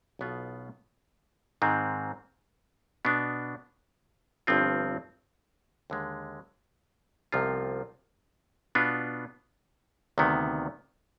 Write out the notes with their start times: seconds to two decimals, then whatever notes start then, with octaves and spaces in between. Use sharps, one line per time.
0.19 B1 B2 B3 F4
1.62 G#2 D#3 G#3 C4
3.05 B2 B3 D4
4.47 G1 G2 F3 C4 F4
5.90 D#2 D3 G#3
7.32 C2 C3 F3 B3 F4
8.75 B2 B3 D4 F4
10.18 D2 C3 D#3 B3